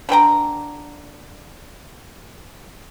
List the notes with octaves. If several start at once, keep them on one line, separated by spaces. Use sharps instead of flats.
D3 B4 G5 A#5